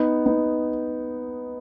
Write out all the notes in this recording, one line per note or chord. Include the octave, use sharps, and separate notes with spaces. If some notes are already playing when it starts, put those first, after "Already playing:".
Already playing: B3 D#4
B3 D#4